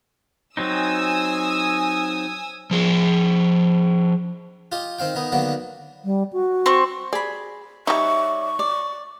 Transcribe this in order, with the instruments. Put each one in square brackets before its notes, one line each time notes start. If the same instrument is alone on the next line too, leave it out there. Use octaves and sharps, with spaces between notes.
[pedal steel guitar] F#3 C4 D#4 [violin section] G#5 D#6 E6
[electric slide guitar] F3 G#4
[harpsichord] F4 G4 D#5
D#3 C4 F5 G5
D#3 B3 D#4
D3 D#3 F#3 A#3 B3
[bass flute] G3
F#4
[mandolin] C4 C#6
[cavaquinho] G#4 B5 [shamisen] D5
[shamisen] G3 D#4 [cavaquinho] C#5 D5 E5 [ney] C#6
[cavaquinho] D5